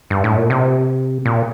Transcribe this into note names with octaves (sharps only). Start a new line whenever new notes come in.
G2
A2
A#2
C3
A#2